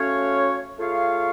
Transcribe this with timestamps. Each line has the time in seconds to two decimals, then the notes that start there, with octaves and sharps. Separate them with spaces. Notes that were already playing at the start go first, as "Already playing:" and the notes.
Already playing: A3 C#4 F#4 C#5 F5
0.79 A3 F4 G#4 C#5 F5